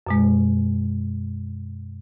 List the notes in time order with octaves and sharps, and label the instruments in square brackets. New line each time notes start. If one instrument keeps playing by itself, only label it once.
[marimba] F#2 B2 G#3